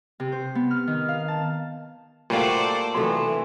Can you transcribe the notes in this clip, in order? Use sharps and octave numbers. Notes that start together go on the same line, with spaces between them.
C3
C5
B3
F6
D#3
F5
A5
A#2 G3 A3 F4 F#4 A4 C5 D5
C3 E3 F#3 A3 A4 C6